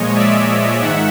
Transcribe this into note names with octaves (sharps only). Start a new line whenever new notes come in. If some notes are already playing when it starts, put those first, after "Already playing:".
Already playing: A#2 F3 G#3 C#5 D#5
D5 E5
G#2 D#3 E5 F#5